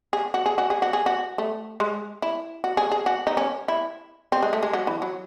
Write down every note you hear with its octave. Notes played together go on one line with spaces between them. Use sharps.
G#4
F#4
G#4
F#4
G#4
F#4
G#4
F#4
A3
G#3
E4
F#4
G#4
G#4
F#4
D#4
C#4
E4
C4
G#3
A3
G#3
F#3
E3
F#3